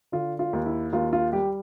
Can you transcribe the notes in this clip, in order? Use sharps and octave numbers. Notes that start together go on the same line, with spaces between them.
D3 F4
F4
D#2
E4
D#2 F4
F4
G3 G4